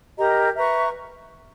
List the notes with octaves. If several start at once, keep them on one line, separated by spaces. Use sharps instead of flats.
G4 A#4 D#5 A#5
B4 E5 A#5 C#6